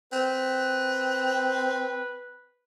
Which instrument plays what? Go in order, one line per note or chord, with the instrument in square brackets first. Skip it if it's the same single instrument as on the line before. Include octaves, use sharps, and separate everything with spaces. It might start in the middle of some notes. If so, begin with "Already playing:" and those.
[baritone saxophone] C4 [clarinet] B4